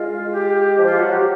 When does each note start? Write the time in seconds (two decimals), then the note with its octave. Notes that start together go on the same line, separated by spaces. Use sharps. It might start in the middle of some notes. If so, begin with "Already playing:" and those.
Already playing: G#3 F4
0.32 G4
0.79 F3
0.85 F4
0.99 F#3 F#4
1.12 G4